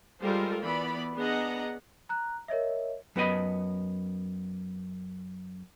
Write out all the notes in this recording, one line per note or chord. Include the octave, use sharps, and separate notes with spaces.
G3 G#3 F4 A4 A#4 C5
E3 B3 D5 B5
B3 D4 G#4 D#5 F#5 A#5
A#5 F#6
A#4 C#5 D#5 E5
F#2 B3 E4 D#5 B5